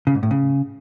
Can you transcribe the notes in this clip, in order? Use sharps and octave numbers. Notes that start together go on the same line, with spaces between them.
C#3
G#2
A2
C#3